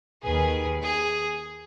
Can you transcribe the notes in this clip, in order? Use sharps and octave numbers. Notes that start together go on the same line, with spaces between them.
D#2 D#3 G#4 B4
G#4